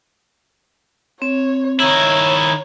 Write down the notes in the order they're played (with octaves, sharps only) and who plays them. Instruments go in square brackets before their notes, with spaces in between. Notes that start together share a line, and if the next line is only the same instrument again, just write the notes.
[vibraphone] C4 [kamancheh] C#5
[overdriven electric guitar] D#3 E4 [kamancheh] C#5 [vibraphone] A#5